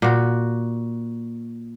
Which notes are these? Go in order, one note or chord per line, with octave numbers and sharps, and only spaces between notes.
A#2 F#4